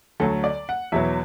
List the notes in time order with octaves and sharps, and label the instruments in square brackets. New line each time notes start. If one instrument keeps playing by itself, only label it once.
[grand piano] D2 D3 F#3 A4
D5
F#5
E2 B2 F#3 E5